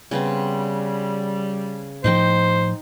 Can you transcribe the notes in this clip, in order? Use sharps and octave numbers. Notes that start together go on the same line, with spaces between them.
C#3 G3 B3 C4
A2 F3 D#4 C5 D#5 G5